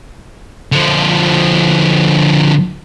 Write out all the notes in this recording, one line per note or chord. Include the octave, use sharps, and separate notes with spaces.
D3 F3